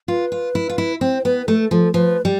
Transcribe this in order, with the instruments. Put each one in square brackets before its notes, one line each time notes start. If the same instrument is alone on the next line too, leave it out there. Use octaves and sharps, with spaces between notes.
[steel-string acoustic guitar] F4 [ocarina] B4
[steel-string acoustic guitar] F4
E4
F4
E4
[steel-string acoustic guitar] C4 [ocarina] C5
[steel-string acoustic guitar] B3 [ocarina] B4
[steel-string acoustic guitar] A3 [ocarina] A4
[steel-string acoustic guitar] F3 [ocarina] A4
[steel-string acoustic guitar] F3 [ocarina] B4
[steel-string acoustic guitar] G3